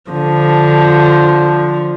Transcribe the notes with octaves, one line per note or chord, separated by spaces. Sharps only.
D3 F3